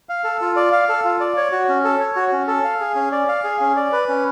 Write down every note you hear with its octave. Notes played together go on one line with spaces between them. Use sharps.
F5
A4
F4
D5
F5
A4
F4
D5
C#5
F#4
C#4
A4
C#5
F#4
C#4
A4
F5
G#4
C#4
D5
F5
G#4
C#4
D5
B4
C#4